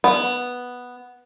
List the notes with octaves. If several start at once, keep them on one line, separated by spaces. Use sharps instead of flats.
B3